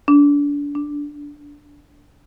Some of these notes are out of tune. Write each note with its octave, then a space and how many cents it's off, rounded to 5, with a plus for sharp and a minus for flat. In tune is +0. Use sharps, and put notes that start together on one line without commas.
D4 -30
D4 -5